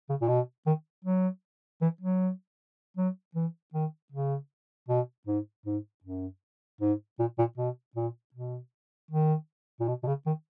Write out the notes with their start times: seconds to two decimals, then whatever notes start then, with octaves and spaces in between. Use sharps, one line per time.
0.09 C#3
0.21 A#2
0.28 B2
0.66 D#3
1.04 F#3
1.81 E3
2.01 F#3
2.97 F#3
3.35 E3
3.74 D#3
4.12 C#3
4.89 B2
5.27 G#2
5.66 G#2
6.04 F#2
6.81 G#2
7.19 A#2
7.38 A#2
7.58 B2
7.96 A#2
8.34 B2
9.11 D#3
9.80 A#2
9.88 B2
10.03 B2
10.07 C#3
10.26 D#3